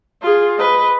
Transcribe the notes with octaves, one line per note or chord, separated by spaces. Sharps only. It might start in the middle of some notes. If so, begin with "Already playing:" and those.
F4 G#4
B4 D#5